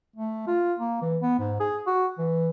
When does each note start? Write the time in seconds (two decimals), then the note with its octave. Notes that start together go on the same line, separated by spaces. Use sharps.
0.16 A3
0.47 F4
0.79 A#3
1.02 E3
1.22 B3
1.39 G#2
1.60 G#4
1.86 F#4
2.18 E3